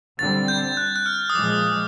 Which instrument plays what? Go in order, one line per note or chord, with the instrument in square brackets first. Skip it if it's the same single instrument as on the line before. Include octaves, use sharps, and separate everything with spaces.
[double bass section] D3 G3 C4 [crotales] A6
[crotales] G6
F#6
F#6
F6
D#6
[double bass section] A#2 F3 G#3 [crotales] D6